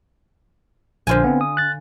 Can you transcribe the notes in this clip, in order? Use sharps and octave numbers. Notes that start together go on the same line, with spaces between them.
A#1 D3 F4 C5 G#5
B3 C4
D#6
F#6 A6